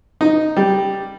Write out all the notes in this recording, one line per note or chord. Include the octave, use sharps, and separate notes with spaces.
D#4
G3